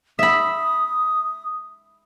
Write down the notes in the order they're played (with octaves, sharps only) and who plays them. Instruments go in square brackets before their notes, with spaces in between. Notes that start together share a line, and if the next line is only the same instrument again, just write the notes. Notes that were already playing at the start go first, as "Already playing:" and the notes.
[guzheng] E5 B5 [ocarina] D#6